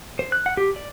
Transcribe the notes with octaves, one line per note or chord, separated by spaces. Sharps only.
C5
F#6
F#5
G4
D5